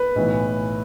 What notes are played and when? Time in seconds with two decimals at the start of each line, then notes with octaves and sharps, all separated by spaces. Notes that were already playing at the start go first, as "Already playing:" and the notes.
Already playing: B4
0.15 B1 A2 E3